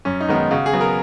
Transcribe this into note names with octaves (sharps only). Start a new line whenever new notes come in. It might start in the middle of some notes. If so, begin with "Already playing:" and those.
F#2 C#4
D#4
D#3 G#3 B3
D#4
C#3 F#4
G#4
F#3 B3
A#4